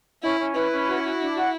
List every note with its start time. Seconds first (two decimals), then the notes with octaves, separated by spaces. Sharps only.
0.23 C#4 E4
0.39 C#4
0.55 E4 B4
0.72 C#4
0.87 F#4
1.04 F#4
1.20 D4
1.36 F#4